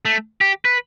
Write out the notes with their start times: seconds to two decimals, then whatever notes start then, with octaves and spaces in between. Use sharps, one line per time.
0.05 A3
0.41 G4
0.65 B4